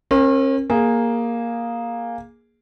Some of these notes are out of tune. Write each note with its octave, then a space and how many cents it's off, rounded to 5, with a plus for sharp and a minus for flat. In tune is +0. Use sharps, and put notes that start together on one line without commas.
C#4 -45 A#4 +0
A#3 +5 G#4 -5